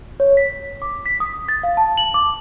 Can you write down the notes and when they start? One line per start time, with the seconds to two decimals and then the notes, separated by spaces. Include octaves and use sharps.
0.20 C#5
0.37 B6
0.82 D6
1.06 B6
1.20 D#6
1.48 A6
1.63 F5
1.77 A5
1.98 F#7
2.14 D6